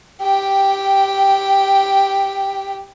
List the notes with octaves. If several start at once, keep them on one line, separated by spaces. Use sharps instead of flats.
G4 G5